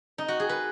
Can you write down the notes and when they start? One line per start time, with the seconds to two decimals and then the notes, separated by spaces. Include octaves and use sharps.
0.18 D#4
0.28 F#4
0.40 G#4
0.49 B4